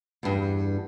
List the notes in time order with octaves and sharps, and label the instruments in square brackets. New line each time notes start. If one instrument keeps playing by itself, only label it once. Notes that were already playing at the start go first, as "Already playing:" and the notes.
[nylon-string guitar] E2 G2